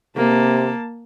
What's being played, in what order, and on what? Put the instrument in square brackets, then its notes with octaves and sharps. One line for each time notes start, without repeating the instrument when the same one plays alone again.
[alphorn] C3 [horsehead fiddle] A#3 A5